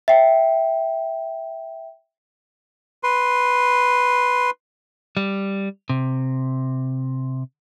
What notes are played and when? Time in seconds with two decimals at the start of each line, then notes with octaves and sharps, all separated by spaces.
0.08 E5 G5
3.03 B4 C6
5.17 G3
5.89 C3